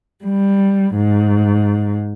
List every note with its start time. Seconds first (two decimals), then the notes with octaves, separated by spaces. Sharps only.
0.23 G3
0.94 G#2